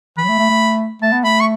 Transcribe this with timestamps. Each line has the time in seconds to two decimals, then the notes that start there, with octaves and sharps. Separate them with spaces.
0.17 E3 B5
0.24 F#3
0.29 A3
0.39 A3
0.50 A3
1.02 A3 A5
1.13 B3
1.24 A3 B5
1.40 C#6